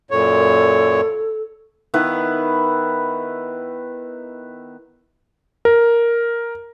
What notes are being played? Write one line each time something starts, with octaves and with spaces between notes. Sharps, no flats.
F#2 A#2 A4 C#5
D#3 B3 E4 B4
A#4